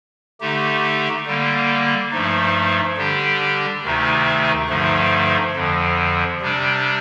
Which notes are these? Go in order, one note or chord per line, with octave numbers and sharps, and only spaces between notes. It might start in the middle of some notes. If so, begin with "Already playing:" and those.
D3 A3 D#4 G4
D3 G3 A#3
G2 F3 A3 D#4
D3 G3 D4 G4
D2 C3 D#3 A3 D#4
G2 D3 F3 A3 D#4
F2 D3 F3
C3 G3 D4